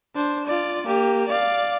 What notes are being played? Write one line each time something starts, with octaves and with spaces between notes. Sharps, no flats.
D4 C5
F4 D5
A#3 G4
D5 F5